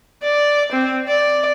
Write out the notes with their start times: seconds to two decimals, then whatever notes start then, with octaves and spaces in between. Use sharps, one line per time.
0.23 D5
0.72 C4
1.08 D5